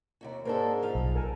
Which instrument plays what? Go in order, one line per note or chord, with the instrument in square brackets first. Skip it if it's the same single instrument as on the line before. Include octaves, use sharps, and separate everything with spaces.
[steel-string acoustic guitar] D#2 C3 F#4
[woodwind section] G#2 [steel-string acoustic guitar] A#3 D4 A4
[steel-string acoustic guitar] F3 F5
[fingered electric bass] B1
[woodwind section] A4 A#4 G#5